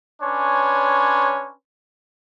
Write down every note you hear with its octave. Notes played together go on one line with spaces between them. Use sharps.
C#4 D4 B4 C#5 G#5 C6